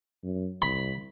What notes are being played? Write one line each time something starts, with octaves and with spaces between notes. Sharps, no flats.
F#2
C2 B5